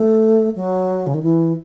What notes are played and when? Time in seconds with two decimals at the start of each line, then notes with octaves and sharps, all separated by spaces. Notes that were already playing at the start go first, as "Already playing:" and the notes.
Already playing: A3
0.56 F#3
1.07 C#3
1.14 D#3
1.23 E3